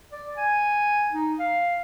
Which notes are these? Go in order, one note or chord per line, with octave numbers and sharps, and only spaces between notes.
D5
G#5
D#4
F5